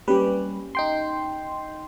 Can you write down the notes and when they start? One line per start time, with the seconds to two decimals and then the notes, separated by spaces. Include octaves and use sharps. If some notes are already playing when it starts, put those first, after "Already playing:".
0.08 G3 A#3 C#4 G4 B4
0.75 D#4 G5 C6